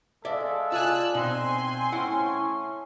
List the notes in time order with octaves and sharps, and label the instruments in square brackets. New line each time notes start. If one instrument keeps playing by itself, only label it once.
[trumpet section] G#3 A4 F5 [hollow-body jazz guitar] D5 E5
[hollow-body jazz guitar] F4 G#5 [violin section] D5 E6 F#6
[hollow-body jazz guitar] B2 D#4 [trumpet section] C4 [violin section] G#5 C6
[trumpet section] A3 C#4 [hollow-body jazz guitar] E4 F#5